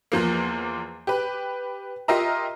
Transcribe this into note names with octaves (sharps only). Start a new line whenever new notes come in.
E2 F3 A#3
G4 B4
F4 G4 A#4 D#5 E5 A#5